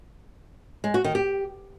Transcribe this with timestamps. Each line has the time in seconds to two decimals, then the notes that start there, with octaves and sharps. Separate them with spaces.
0.84 G#3
0.94 F#4
1.04 D#3
1.15 G4